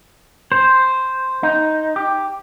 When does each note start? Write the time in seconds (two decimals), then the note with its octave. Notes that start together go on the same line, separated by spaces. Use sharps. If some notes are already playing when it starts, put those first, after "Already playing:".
0.52 C5
1.43 D#4
1.96 G4